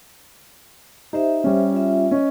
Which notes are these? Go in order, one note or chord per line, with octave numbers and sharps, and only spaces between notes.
D#4 G4 C5 E5
G3 C#4
F4 E5
C#4 D#5